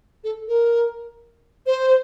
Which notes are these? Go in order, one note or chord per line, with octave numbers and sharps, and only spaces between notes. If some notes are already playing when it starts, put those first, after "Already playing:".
A4
A#4
C5